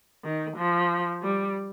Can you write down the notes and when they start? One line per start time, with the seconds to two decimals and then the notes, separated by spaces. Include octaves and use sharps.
0.24 D#3
0.57 F3
1.23 G3